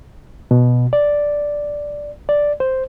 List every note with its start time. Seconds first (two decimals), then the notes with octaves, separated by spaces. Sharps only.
0.51 B2
0.93 D5
2.29 D5
2.60 C5